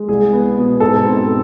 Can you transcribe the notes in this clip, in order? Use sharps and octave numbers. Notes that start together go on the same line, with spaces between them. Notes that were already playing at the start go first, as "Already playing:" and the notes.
Already playing: G#3
C2 G#4
B3
B2
G#2 A4
C4